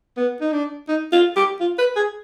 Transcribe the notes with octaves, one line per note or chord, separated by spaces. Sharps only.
B3
D#4
D4
D#4
F4
G4
F4
B4
G#4